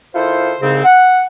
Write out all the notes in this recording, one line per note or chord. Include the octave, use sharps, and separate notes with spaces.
D#3 E4 F4 A4 C5
C2 G#2 C#3 C4
F#5